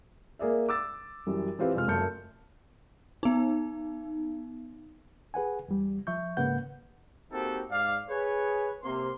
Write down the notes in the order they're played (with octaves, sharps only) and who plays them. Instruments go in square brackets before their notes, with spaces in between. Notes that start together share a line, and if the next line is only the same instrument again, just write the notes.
[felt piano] A#3 G#4 D5 E5
D6 E6 A6
F#2 E3 G3
E3 C4 F4 G4 B4
F2 C3 G#3 F4 F6
F#1 F#2 A3 A5 G6 C#7
[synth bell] B3 D#4
[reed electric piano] G#4 B4 F#5 G#5
E2 G3
F3 E5 C#6 G6
G#2 C#3 A#3 B4 F#5 G6
[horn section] A#3 C4 D#4 F#4 G4 A4
G#2 D5 F5
G#4 B4 C#5
C3 A#3 C6